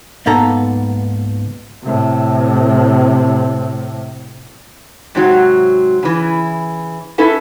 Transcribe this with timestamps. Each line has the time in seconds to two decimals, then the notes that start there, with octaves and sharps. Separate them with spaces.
0.26 C#2 G#2 A#3 B3 A4 A#5
1.84 A2 C3
5.15 G#2 C3 F#3
6.03 C#3 E3
7.18 C#4 E4 A4 B4